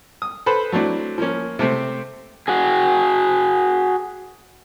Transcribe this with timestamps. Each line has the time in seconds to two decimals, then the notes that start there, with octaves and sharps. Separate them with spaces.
0.22 D#6
0.46 A4 B4 C5 B5
0.72 F#3 A3 C4 D4 E4
1.18 F3 A#3 C#4
1.59 C3 A3 C4
2.48 F#4 G#4